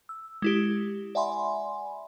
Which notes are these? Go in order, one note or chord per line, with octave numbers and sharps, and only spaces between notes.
E6
G#3 E4 G4
D5 E5 F#5 G#5 B5 C6